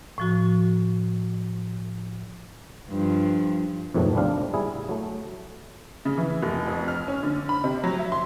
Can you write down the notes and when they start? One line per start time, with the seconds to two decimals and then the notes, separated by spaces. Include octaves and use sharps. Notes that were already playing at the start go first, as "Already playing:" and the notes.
0.18 A2 F3 F#4
2.90 G2 F3
3.94 F2 G#2 B2 D#3 F#3 A3
4.15 C2 G3 C4 D4 F5
4.54 G3 E4 G#4
4.89 F#3 A3
6.05 C#3
6.18 E3
6.43 F1
6.67 F2
6.88 F6
7.08 C#4
7.23 D3
7.49 B5
7.64 C3
7.84 F#3
7.99 E5
8.12 C6